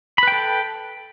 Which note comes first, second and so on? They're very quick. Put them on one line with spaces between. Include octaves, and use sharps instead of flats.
B5 B4 G5 A4